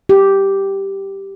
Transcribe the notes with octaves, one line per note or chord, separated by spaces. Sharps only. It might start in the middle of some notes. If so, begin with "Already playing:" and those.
G4